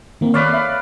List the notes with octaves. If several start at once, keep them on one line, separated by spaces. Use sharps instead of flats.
D#3 A#3 C4
B4 C#5 D5 F5
E5